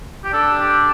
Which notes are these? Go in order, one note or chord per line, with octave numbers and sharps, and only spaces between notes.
G4
D4 A4
G4